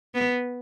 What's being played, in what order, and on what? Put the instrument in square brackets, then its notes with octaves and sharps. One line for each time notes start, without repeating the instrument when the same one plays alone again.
[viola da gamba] B3